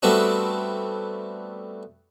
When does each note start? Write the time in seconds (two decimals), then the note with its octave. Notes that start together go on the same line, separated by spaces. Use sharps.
0.03 G3 A3 B3 C4 D4 F#4